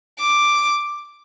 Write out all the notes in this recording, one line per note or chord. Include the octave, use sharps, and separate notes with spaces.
D6